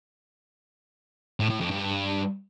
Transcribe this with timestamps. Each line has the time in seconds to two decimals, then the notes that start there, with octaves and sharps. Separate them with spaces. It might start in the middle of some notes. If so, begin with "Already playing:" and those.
1.40 A2
1.50 A2
1.60 F2
1.71 G2